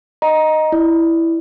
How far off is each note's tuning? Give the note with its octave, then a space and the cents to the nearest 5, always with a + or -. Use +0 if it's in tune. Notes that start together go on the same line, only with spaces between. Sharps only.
D#5 +0 F#5 +0 A#5 +15
E4 +0 D5 +20